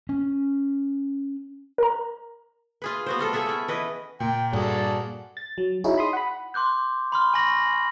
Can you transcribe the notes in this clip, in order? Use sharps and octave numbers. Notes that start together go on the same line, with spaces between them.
C#4
A#4 A#5
F4 G#4 B4
B3 F#4 C5
G3 F4 A4
G#4 A4 E5 F#5
C#4 E4
E3 B4 D#5
A#2 G5
G2 F#4 G#4 A4 D5
A6
F#3
D#4 E4 F#4 G#4 C#5
B5 C6 D#6
F#5 B5
C6 D6 F#6 G6
B5 C6 F6
G#5 C6 C#6 A#6 F#7